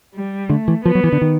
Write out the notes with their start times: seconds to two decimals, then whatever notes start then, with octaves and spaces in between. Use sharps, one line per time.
0.14 G3
0.49 D3 A3
0.68 E3
0.85 F3 B3
0.95 F#3
1.04 E3
1.12 D3
1.21 D#3